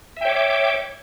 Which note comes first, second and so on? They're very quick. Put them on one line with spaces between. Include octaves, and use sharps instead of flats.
E5 G5 C#5 D6